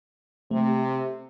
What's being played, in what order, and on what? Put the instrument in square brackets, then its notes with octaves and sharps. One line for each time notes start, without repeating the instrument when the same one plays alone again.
[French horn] C3 [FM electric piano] A3